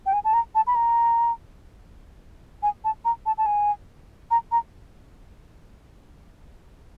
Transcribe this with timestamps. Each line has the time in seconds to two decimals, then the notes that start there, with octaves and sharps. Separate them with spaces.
0.06 G5
0.13 G#5
0.24 A5
0.33 A#5
0.55 A5
0.67 B5
0.75 A#5
2.63 G#5
2.84 A5
3.05 A#5
3.26 A5
3.38 A5
3.46 G#5
4.31 A#5
4.52 A#5